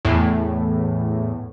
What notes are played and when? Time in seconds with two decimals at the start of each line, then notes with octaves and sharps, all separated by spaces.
0.05 E2 A2